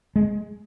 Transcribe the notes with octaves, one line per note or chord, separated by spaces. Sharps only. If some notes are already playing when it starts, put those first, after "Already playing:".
G#3